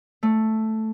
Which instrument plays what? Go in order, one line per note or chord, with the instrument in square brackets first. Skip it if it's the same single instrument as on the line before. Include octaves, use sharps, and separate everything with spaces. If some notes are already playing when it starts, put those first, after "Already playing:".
[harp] A3